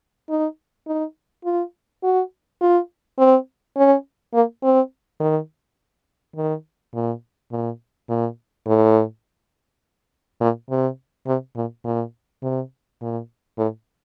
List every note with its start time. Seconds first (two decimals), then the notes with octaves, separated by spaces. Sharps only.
0.29 D#4
0.87 D#4
1.45 F4
2.03 F#4
2.61 F4
3.18 C4
3.77 C#4
4.34 A#3
4.63 C4
5.20 D#3
6.36 D#3
6.94 A#2
7.52 A#2
8.09 A#2
8.67 A2
10.41 A#2
10.70 C3
11.27 C3
11.56 A#2
11.84 A#2
12.43 C3
13.01 A#2
13.58 A2